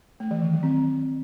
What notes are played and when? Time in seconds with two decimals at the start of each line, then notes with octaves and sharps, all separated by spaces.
0.20 A3
0.31 E3
0.42 D#3
0.52 F#3
0.63 C4